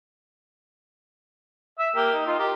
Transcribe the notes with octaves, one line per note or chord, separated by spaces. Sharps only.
E5 E6
A#3 G4 G5
D#4
D#4 F4
G4 A#4